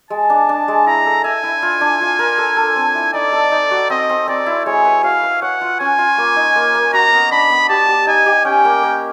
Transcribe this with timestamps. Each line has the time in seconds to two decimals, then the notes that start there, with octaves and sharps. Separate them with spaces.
0.10 G#3 A5
0.30 D4
0.49 D4
0.68 G#3
0.86 E4 A#5
1.06 A4
1.24 E5 G#5
1.43 E4
1.62 F4
1.81 D4
2.01 F4
2.19 A#4
2.38 A4
2.57 A4
2.76 C4
2.95 E4
3.14 D#4 D5
3.32 A4
3.52 D#4
3.71 F#4
3.90 C4 D#5
4.10 C4
4.28 C4 D5
4.46 E4
4.65 G#3 C#5
4.85 B4
5.04 F#4 F5
5.23 B4
5.42 C#5 F#5
5.61 F4
5.80 C#4 G#5
5.99 F4
6.18 A#3
6.36 D#4
6.56 A#3
6.75 A#3
6.93 F#4 A#5
7.12 B3
7.31 D4 B5
7.50 B3
7.69 G4 A5
7.89 G4
8.07 D#4 G#5
8.26 G4
8.45 C#4 G5
8.65 A#3
8.83 A#3